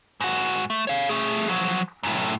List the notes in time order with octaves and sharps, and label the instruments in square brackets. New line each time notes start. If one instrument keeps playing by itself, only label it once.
[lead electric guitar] G#2 F#4
A3
C#5 F5
A3 G#4
F3 F#3
F#2 A2